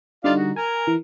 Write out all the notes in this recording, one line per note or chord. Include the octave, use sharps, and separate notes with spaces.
D3 G3 D#4 F4 D5 F5
F#4
A#4 G#5
E3